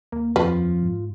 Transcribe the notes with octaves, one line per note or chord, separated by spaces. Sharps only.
D#2 A#3
F2 F3 F4 B4
G#2